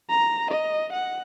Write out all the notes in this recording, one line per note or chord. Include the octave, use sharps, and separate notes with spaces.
A#5
D#5
F#5